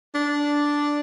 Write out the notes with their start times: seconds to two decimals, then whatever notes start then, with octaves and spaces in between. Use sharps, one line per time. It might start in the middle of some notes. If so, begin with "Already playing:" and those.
0.15 D4